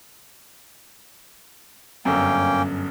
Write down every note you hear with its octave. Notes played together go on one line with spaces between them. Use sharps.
G1 F#2 A#3 C#4 G5